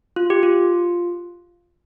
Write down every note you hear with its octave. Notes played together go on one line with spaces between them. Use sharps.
F4
G4
F4